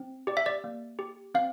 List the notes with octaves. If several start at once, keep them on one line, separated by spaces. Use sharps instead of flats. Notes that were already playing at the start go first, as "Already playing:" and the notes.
Already playing: C4
G4 D5
E5
D5
A#3
G4
C4 F5